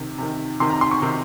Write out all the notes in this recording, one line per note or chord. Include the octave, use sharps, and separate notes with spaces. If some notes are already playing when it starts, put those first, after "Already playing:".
Already playing: C3 D#3
C3 D#3
C3 D#3 C6
A#5
C6
C#6
C3 D#3